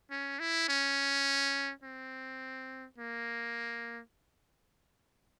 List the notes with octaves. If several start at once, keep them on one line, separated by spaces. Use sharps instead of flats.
C#4
E4
C#4
C4
A#3